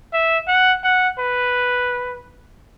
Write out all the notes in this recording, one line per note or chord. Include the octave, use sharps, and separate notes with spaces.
E5
F#5
F#5
B4